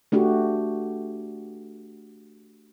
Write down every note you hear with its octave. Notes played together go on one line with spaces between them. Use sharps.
A3 D4 F#4 G4